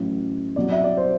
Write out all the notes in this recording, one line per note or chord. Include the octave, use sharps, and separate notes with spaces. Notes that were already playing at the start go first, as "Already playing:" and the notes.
Already playing: A1 A2 F#3
C2 B2 F#3 D5
E5
D5
C5